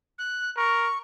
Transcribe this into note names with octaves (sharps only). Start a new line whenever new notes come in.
F#6
A#4 C#6